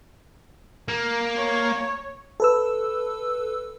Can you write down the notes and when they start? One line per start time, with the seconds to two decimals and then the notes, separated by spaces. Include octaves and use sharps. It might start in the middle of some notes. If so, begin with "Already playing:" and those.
0.88 A#3
1.37 C#5
2.40 A4 B4 E6